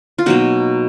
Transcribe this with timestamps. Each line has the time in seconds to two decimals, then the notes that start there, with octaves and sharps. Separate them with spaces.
0.18 F4
0.26 B2 F#3 A#3 D#4 F#4